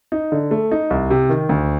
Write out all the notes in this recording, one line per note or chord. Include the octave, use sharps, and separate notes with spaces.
D#4
D3
A3
D#4
C2
C3
D#3
D2